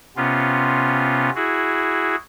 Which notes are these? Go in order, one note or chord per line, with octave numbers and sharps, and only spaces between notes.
C3 B3 C#4 F4
E4 F#4 G#4